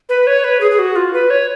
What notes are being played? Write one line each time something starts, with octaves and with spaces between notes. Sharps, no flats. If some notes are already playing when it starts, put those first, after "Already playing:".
B4
C#5
B4
G#4
G#4
F#4
F4
B4
C#5